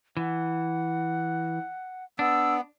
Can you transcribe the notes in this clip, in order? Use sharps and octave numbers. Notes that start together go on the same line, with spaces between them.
E3 F#5
B3 D4 E6